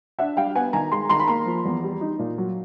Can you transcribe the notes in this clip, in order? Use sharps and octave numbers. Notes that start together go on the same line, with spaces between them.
D4 E5 F#5
G3 F5 G5
B3 F#5 G#5
D#3 G#5 A#5
G#3 A#5 C6
D#3 A#5 C6
B5
A#3 A#5 C6
F3
E2
G3
D#4
A#2
F#3